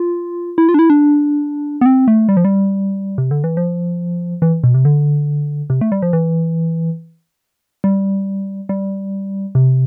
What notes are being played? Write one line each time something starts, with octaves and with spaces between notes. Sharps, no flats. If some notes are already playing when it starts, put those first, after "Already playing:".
Already playing: F4
E4
F4
D4
E4
D4
B3
C4
A3
G3
F3
G3
C3
D3
E3
F3
E3
B2
C3
D3
C3
A3
G3
F3
E3
G3
G3
C3